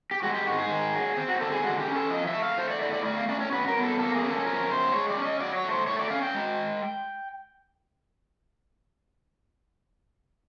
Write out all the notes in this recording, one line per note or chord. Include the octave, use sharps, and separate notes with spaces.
G4
G#3 F#4
G4
G#2 F#4
G#4
D#3
F#3
C4
F#4
D3 A4
G#4
G#3 F#4
G4
C#4
A4
F3 D#5
E5
A3
F5
A3 C5
D5
A2 D5
D5
A3 D5
F5
C#4 D5
C#5
F#3 B4
A#4
B3
A4
A#3 A4
G#4
C#4
A4
F3 A#4
F#2 C5
G#3 C#5
D5
C#4
D#5
F#3 D5
C#5
A3
C5
A3 C#5
D5
C#4 F5
G5
G#3